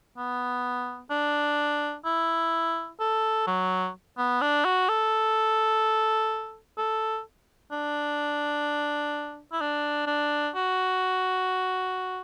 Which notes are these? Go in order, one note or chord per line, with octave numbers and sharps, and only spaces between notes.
B3
D4
E4
A4
F#3
B3
D4
F#4
A4
A4
D4
E4
D4
D4
F#4